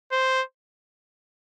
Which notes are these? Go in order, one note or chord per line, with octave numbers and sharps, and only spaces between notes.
C5